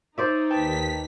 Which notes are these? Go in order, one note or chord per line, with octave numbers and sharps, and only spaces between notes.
D#4 C5 D5 E5
D#2 B4 G5 A5 B6